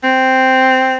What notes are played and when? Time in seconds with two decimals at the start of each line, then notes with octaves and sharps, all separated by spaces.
0.04 C4